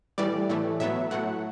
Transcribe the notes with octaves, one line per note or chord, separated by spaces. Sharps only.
A2 E3 G3 D5
A2 E3 A3
A2 F#3 B3 E5
A2 F#3 A3 F#5